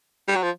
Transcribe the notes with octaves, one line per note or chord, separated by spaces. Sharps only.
G3
F#3
F3